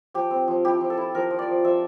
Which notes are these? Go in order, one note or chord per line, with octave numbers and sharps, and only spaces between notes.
F3 G4
C4
F3
E4 G4
F3
A4
E4
F3 A#4
F3
D5
F3
F3 E5